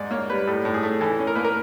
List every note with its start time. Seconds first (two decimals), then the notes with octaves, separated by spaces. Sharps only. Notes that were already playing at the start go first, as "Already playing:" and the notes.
Already playing: G#2 D5
0.11 A#3 C#5
0.30 G3 B4
0.47 A2 A4
0.65 A2
0.74 G#4
0.83 A3
1.01 E3 A4
1.19 C#4
1.27 A#4
1.35 A#3 B4
1.44 A#4